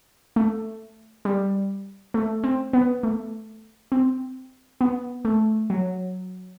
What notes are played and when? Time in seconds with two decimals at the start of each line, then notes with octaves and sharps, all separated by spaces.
0.36 A3
1.25 G3
2.14 A3
2.44 C4
2.73 B3
3.03 A3
3.92 C4
4.81 B3
5.25 A3
5.70 F#3